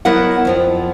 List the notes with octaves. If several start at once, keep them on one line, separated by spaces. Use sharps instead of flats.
F#3 B3 E4 A#4 D#5 F#5
F2 F3 G5